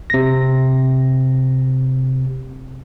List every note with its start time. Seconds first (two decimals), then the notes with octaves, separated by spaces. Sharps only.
0.10 C3 A#6